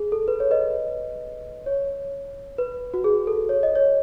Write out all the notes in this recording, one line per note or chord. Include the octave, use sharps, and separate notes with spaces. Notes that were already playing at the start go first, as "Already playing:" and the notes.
Already playing: G#4
A4
B4
C#5
B4 D#5
C#5
B4
F#4
G#4
A4
C#5
D#5
C#5